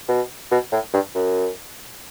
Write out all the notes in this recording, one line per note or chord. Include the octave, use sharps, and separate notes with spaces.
B2
B2
A2
G2
F#2